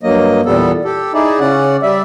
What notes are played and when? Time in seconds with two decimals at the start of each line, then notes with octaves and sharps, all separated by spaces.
0.03 G2 F#3 A#3 D#5
0.46 E2 A#2 G3 B3 A4
0.85 G4 A4
1.14 D#4 E4 G#4 D5
1.40 C#3 C#4 D5 F#5
1.83 G3 D5 E5